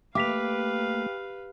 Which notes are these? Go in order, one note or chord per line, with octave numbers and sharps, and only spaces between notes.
A3 A#3 G4 B4 F5 D6 B6 F7